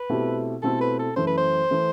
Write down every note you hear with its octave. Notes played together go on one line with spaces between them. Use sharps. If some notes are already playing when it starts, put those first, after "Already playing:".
Already playing: B4
B2 A3 C4 E4 G4
B2 A3 C4 E4 G4 A4
B4
A4
F#2 E3 A3 C5
B4
C5
E3 A3